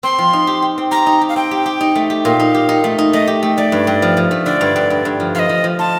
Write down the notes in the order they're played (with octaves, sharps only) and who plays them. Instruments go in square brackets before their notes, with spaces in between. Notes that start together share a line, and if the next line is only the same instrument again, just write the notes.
[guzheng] C4 [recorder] C6
[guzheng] F3
D#4
G4
G4
C4
[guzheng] G4 [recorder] A#5
[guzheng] D#4
G4
[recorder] F5
[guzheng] C4 [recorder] G5
[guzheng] G4
G4
D#4
A3
G4
[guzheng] A#2 [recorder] F5
[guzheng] D#4
G4
D#4
A3
D#4
[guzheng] A3 [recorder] D#5
[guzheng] G4
A3
[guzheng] A3 [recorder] D5
[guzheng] G2
G2
F3
F3
A3
[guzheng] D3 [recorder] D5
[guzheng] G2
G2
G2
G2
F3
[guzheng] F3 [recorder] F5
[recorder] D#5
[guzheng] F3
F3
[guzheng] F4 [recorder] A5